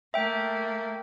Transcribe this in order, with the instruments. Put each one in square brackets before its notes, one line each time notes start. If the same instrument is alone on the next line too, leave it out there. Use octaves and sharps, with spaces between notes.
[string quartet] A3 A#3 [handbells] E5 G5